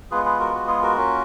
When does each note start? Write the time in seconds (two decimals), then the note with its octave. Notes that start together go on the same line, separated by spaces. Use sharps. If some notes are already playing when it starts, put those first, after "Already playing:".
0.11 G#3 B3 F4 G#4 B4
0.25 G#4 B4
0.40 F#4 A#4
0.54 F#4
0.67 G#4
0.83 F#4 A#4
0.97 A#3 C#4 F4